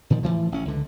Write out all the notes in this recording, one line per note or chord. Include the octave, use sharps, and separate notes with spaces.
A#2 D#3 F3
A2 C#3 E3 F3
A1 C#4
C#2 D3